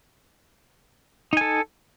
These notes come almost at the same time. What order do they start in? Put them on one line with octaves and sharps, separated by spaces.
D#4 G#5 A4